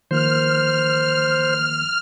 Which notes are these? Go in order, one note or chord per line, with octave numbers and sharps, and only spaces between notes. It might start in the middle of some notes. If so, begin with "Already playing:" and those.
D#3 F3 A#3 C5 F6